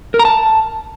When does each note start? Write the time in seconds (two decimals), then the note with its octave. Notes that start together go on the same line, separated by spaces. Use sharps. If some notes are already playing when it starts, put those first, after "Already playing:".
0.14 A#4
0.19 A#5
0.25 A5